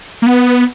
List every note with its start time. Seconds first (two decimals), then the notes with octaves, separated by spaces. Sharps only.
0.22 A#3
0.27 B3